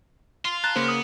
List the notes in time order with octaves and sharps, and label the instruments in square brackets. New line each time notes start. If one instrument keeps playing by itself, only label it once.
[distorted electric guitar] F4 [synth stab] C6
[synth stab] A5 [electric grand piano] A#5 [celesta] F#6
[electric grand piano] C#3 A#3 A#4 [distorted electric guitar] B3 [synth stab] C5
[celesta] D#6